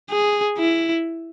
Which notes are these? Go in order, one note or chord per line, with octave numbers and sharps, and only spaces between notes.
G#4
E4